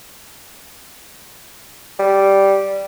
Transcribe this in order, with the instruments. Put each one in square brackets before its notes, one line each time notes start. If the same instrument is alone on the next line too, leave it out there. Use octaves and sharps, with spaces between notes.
[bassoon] G3